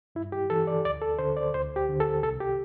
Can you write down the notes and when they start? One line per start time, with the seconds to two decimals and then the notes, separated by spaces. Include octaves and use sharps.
0.15 G2 E4
0.32 G4
0.50 E3 A4
0.67 D5
0.84 D2 D5
1.02 A4
1.19 D3 C5
1.37 D5
1.54 D2 C5
1.76 G4
1.89 D3
2.00 A4
2.23 C2 A4
2.40 G4